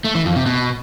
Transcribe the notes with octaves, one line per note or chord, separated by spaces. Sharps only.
A3
E3
F2
C3
B2